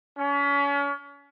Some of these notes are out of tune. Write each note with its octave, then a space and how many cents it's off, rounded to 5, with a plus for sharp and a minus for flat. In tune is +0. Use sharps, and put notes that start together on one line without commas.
C#4 +35